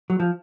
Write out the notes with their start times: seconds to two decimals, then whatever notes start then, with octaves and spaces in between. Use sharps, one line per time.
0.10 F#3
0.20 F3